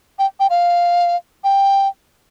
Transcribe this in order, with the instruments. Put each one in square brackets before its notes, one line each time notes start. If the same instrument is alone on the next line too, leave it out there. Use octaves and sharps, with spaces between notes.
[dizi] G5
G5
F5
G5